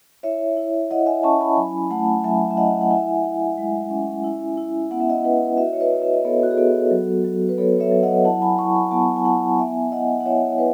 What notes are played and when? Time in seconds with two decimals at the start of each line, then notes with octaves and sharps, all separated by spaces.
0.23 E4 C#5 E5
0.57 E4
0.90 E4 D#5 F#5
1.07 E5 G#5
1.23 C#4 A5 C#6
1.41 G#5 B5
1.57 F#3 G#5 B5
1.91 A3 F#5 A5
2.24 F#3 E5 G#5
2.51 E5
2.57 E4 D#5 F#5
2.81 F#5
2.90 E4 E5 G#5
3.24 E4
3.58 G#3
3.90 C#4
4.24 E4
4.57 E4
4.91 B3 F#5
5.00 E5
5.10 D#5 F#5
5.24 E4 B4 D#5
5.57 F#4 E5
5.66 D#5
5.73 C#5
5.80 B4 D#5
5.92 F#4
6.02 E5
6.14 D#5
6.25 B3 A4 C#5
6.43 F#4
6.51 G#4
6.58 B3 F#4 A4
6.91 F#3
7.25 F#3
7.49 B4
7.58 B3 A4 C#5
7.80 C#5 E5
7.92 F#3
8.03 D#5 F#5
8.25 E4 F#5 A5
8.42 G#5 B5
8.58 E4 A5 C#6
8.75 G#5 B5
8.91 B3 F#5 A5
9.16 G#5
9.25 E4 F#5 A5
9.58 B3 E5 G#5
9.92 E4 D#5 F#5
10.20 F#5
10.26 E4 C#5 E5
10.58 E4 B4